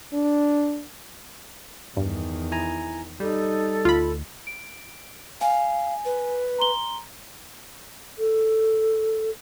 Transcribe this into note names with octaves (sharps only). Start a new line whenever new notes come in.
D4
E2 G2 D#3
E4 G#5 A#5
G3 D#4 A4
D2 F4 B5
D7
F5 G#5
B4
A#5 C6 G7
A4